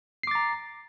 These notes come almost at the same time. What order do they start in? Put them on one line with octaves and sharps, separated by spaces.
C7 D6 A6 A#5